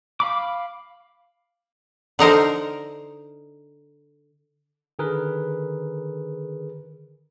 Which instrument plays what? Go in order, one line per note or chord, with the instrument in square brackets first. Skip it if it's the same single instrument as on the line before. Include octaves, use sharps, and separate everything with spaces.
[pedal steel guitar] F5 B5 D6
[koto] D3 D#4 A#4 C5
[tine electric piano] D3 D#3 G#4 A#4 B4